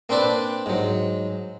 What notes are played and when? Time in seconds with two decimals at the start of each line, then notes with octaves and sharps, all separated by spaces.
0.09 A#3 C4 D4 B4 D5
0.66 G#2 F#3